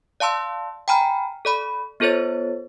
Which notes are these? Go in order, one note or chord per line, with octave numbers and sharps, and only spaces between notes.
D5 F5 A5 C6 E6
G5 G#5 A#5 B5 F6
A4 D5 B5
B3 F4 A4 C5 C#5 A6